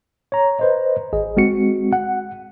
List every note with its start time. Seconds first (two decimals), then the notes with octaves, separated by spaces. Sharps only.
0.32 C#5 A#5
0.59 B4 C5 D#5
1.13 G#1 G#4 D#5
1.37 G#3 C4 F#4 C#7
1.93 F#5